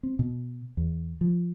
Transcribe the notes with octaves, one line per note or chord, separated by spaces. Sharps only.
C4
B2
E2
F3